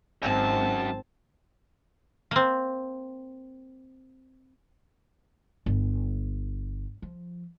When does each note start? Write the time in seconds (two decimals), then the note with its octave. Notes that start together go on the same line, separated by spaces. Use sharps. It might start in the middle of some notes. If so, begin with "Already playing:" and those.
0.22 G#1 F#2 C4 A5
2.31 A#3 C4
5.66 G1
7.02 F3